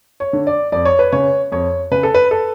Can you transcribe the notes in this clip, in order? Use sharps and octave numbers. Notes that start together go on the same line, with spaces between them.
C#5
D3
D5
F2 D5
C#5
B4
C#3 C#5
F2 C#5
C#3 B4
A4
B4
A4